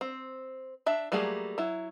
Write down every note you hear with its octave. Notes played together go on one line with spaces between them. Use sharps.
C4
D4 E5
F#3 G3 A3 A#3 G#4
F#3 E4